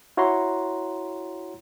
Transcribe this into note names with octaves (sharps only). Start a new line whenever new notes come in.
E4 F#4 C#5 F#5 A#5 C6